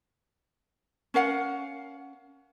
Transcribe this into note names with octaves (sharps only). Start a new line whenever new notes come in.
C#4 A#4 F5 F#5